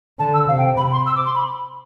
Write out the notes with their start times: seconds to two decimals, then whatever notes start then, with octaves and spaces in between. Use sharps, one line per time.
0.19 D3 A5
0.34 E6
0.48 C3 F5
0.58 G5
0.77 C3 B5
0.92 C6
1.06 E6
1.16 D6
1.25 C6
1.35 B5